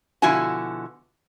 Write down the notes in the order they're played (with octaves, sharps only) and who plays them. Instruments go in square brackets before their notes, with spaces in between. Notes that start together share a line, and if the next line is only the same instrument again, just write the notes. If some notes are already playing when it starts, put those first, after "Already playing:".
[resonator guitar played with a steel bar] B2 D3 F3 E4 F#4 G#5